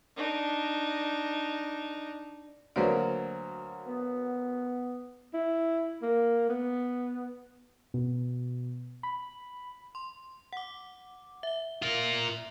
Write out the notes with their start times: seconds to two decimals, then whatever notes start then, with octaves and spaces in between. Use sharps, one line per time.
0.16 D4 D#4
2.76 D2 F#3 A#3 B4 C5 D5
3.86 B3
5.34 E4
6.02 A#3
6.49 B3
7.94 B2
9.03 B5
9.95 C6
10.53 F#5 D6
11.43 E5 G7
11.82 F4 A#4